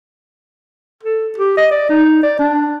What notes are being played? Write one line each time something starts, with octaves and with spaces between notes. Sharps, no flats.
A4
G4
D#5
D5
D#4
D5
D4